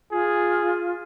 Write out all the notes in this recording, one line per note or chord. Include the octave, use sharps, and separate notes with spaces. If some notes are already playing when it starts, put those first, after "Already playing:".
F4 G#4